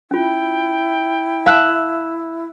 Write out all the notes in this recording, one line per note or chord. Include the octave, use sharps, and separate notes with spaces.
C#4 E4 F4 G5
E5 F5 A5 E6 F#6